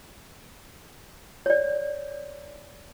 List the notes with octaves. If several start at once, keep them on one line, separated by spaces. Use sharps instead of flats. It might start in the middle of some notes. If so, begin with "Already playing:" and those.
C#5 D5